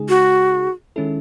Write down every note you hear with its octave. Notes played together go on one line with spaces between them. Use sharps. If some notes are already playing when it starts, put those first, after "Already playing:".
Already playing: C#3 G#3 D#4 G#4
F#4
D#3 G#3 C#4 E4 A4